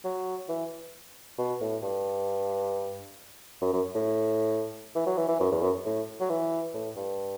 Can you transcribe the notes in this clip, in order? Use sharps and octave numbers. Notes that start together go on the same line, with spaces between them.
F#3
E3
B2
A2
G2
F#2
F#2
A2
E3
F#3
E3
E3
F#2
E2
F#2
A2
F#3
E3
A2
G2